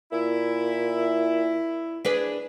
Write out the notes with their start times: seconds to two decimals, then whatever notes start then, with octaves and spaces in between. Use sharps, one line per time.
0.12 A#2 E4
2.05 D4 G#4 B4